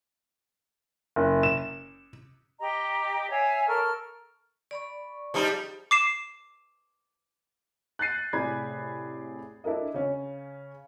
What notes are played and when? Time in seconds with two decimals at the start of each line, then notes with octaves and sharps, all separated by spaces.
1.16 F#1
1.43 E7
2.60 G4 D#5 A#5
3.30 C#5 E5 F5 G#5
3.67 A4 A#4 C#6 F6
4.71 D5 B5 C#6
5.34 F3 G3 D#4 G4 G#4
5.91 D6 C7 E7
7.99 F#6 G6 A6 C7 D#7
8.33 A2 C3 G#4 D5 B5 G#6
9.64 D4 E4 A4 A#4 D#5
9.94 C#3 C#4